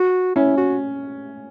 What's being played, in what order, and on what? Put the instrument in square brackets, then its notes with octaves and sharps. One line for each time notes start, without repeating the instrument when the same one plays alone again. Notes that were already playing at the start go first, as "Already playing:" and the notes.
Already playing: [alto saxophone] F#4
[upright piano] C#4 [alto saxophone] E4
[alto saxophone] F#4